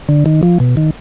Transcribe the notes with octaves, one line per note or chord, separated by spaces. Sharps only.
D3
D#3
F3
B2
D#3